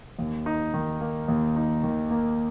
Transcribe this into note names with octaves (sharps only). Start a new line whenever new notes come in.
D#2
D#4
D#3
A#3
D#2
D#4
D#3
A#3